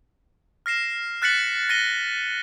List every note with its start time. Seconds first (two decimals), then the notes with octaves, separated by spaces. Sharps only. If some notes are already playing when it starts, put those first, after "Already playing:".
0.66 F6 A#6 C7 E7
1.22 F6 F#6 A6 B6 C#7 F#7
1.69 A6 A#6 C#7 D#7 G7